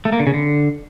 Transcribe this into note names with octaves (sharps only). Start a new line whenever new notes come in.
A3
A#3
D3
C#3
D3